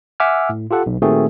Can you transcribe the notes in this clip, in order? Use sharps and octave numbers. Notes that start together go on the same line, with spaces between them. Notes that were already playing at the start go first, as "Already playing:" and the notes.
E5 F#5 G#5 D6 E6 F6
A2
F4 G4 A4 F#5
B1
A#2 D#3 A3 C4 F#4 G#4